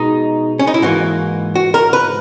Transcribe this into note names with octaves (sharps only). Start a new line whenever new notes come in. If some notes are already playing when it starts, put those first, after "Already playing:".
Already playing: B2 G#3 D#4
C#4
D#4
E4
G#2 E3 A#3 F#4
F#4
A#4
B4